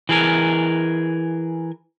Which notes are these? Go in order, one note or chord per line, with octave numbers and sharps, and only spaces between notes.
E3 G#4 A#4